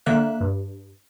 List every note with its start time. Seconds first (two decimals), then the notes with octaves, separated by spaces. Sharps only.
0.06 D3 A#3 E5 F#6
0.41 G2